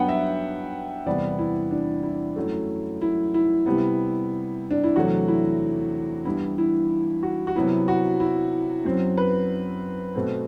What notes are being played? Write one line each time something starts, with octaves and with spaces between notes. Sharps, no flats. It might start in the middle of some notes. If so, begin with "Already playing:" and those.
Already playing: G2 F#3 B3 F#5 G5
E5
E2 C3 G3 B3 D5
E4
D4
E4
F#2 F#3 A3
E4
E4
C3 G3 B3
D4
E4
E2 C3 F#3 A3 F#4
E4
G2 E3 G3 B3 E4
E4
F#4
F#4
C3 F#3 B3 E4
F#4
E4
F#2 F#3 C4
B4
B2 A3 C4